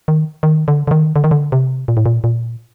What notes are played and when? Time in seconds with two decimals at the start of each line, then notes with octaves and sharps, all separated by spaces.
0.08 D#3
0.43 D#3
0.68 D3
0.87 D3
0.91 D#3
1.16 D3
1.24 D#3
1.31 D3
1.52 C3
1.88 A#2
1.97 A2
2.06 A#2
2.24 A#2